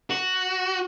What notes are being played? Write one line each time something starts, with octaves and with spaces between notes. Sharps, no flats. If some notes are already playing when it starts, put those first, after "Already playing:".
F#4